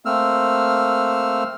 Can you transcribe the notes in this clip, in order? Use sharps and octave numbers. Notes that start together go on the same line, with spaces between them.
A3 A#3 C4 E6 F6